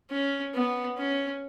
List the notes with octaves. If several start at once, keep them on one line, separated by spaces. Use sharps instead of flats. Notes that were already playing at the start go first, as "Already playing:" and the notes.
C#4
B3
C#4